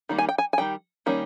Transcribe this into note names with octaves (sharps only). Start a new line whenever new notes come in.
D#3 G3 A#3
G#5
G5
G#5
G#5
D#3 G3 G5
D#3 G3 A#3 C#4